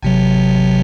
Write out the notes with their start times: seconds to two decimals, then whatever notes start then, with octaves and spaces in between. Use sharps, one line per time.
0.03 G#1 C3 F#3